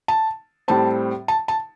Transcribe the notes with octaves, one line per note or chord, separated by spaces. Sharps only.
A5
A2 G3 C4 A5
A5
A5